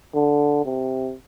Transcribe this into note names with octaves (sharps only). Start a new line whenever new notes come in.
D3
C3